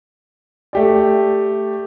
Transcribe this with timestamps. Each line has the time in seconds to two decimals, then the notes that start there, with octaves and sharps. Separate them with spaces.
0.73 A3 G4 D5